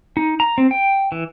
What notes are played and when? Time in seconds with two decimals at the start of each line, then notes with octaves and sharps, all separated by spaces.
0.17 D#4
0.40 A#5
0.58 C4
0.71 G5
1.12 E3